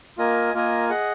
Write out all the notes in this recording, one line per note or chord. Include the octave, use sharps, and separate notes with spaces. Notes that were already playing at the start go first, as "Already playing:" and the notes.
A#3 F4 A#4 D#5 G#5
A#3 F4 A#4 D#5 G#5
G#4 D#5 F#5